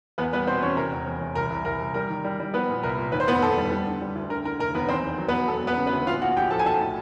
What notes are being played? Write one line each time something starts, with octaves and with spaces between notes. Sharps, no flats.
E2 B3 B4
G3 B3 B4
B2 C4 C5
E2 C#4 C#5
C3 A#4
E1
E2
E2
C2 A#4
C2
C2 A#4
C2
G3 A#4
D#3
G3
G3
F3 B3 B4
A#2
C2 A#4
A#2
D#2 B4
C5
F1 B3 B4
F1 A4
G3
G3
D3
G3
D2
D3 A#4
D3 A#4
F1 A#4
D#2 B3 B4
E2 C4 C5
E2
F#3
B3 B4
F#3
E1 A4
E1 B3 B4
C#3
B3 B4
D2
A#1 F4 F5
A#1 F#4 F#5
A#1 G4 G5
F3 A4 A5
G#5
B1 A4 A5
A2